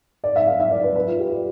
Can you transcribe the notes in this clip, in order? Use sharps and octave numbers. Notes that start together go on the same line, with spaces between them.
D5
E5
F5
E5
D5
B4
B4
F4
G4
G4